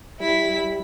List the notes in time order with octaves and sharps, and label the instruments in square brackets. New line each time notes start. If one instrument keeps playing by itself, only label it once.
[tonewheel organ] G3 [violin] E4 B6